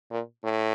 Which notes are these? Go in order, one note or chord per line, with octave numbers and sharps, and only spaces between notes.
A#2
A2